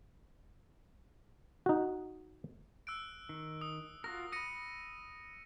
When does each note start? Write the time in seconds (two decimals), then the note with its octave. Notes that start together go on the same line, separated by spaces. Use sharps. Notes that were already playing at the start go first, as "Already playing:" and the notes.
1.66 D#4 F#4
2.87 E6 F#6 D7
3.29 D#3
3.61 D#6
4.04 F4 F#4 A#4 A#6
4.32 B5 D#6 A#6 C#7 D#7